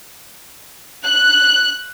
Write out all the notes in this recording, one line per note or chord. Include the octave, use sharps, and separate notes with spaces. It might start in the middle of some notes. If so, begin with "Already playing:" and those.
F#6